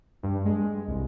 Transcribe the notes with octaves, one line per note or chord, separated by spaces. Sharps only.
G2
G#3
C2